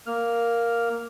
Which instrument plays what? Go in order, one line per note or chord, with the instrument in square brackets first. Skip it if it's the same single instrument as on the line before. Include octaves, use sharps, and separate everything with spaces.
[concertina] A#3 F6